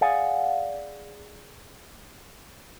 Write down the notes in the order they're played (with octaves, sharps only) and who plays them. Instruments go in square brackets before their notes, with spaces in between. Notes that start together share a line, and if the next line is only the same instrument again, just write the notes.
[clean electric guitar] G#4 D5 F5 F#5 G#5